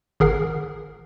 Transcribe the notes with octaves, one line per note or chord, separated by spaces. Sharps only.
G#1 G#4 A#4 F#5 C7